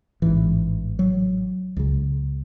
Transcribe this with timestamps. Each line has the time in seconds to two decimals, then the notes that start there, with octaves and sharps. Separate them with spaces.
0.22 A1 G#2 E3
0.99 F#3
1.77 C#2 C#3